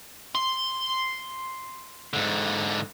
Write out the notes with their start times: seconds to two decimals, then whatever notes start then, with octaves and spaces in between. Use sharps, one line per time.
0.35 C6
2.13 G#2 D3